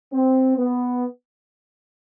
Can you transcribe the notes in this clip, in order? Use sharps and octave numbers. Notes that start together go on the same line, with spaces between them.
C4
B3